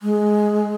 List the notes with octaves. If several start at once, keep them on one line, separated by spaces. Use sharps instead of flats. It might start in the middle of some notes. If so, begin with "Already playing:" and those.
G#3